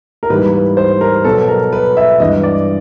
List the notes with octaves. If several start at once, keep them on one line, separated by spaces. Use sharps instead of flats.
A#4
G#2 E3 G3 A#3 B4
B4
C5
A#4
B2 F#3 B3 A4
A#4
B4
E5
G2 E3 G#3 B3 D#5
D5